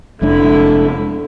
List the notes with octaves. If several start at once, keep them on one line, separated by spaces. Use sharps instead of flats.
F1 F2 D3 G#3 D4 E4